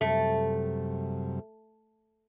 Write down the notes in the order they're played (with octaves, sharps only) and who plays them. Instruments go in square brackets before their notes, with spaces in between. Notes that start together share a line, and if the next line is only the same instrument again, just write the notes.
[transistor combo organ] F#2 C3 G3 [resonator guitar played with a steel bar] A3